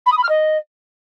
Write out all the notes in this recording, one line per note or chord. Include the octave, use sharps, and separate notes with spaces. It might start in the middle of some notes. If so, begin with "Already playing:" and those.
B5
D#6
B5
F6
D#5